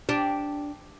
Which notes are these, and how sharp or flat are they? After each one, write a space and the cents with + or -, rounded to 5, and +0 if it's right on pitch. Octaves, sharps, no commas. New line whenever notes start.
D4 -10 G4 +0